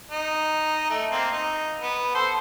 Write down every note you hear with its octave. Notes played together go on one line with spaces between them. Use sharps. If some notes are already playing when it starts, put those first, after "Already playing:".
D#4
A3
A#3 C4
D#4
B3
A4 C5